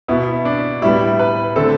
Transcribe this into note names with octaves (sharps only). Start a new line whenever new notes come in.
B2 B3 E4
D4
A2 G3 B3 E4
B4
D3 A3 C4 A4